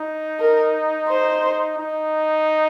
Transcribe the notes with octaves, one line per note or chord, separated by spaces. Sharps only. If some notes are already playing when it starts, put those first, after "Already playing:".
Already playing: D#4
A#4
C5
D#4